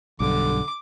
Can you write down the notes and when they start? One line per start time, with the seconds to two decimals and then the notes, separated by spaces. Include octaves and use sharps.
0.20 B1 G2 D3 D6